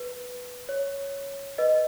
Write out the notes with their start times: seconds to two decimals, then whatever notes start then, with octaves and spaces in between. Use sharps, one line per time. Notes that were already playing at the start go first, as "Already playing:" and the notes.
Already playing: B4
0.69 C#5
1.58 B4 D#5